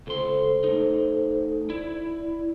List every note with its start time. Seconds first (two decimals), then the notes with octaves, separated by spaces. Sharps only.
0.07 C#2 A4 C5 C6
0.64 A3 D#4
1.70 E4 D5